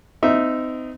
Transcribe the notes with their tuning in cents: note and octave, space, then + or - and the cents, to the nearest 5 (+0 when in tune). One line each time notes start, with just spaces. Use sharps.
C4 -35 D#4 +0 E5 +0